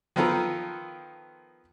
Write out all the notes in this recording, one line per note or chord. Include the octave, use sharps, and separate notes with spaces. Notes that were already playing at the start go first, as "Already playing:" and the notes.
D#3 F3 B3 F4 A4 A#4